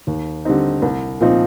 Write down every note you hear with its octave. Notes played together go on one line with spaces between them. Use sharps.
D#2
D3 G3 C4 D#4
C2
A#2 F3 C4 D#4